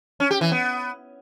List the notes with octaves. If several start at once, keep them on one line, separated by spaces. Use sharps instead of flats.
C#4
G4
E3
B3